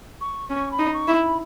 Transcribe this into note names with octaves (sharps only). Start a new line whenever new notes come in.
C#6
C#4 C#6
B5
D#4
C#6
E4
B5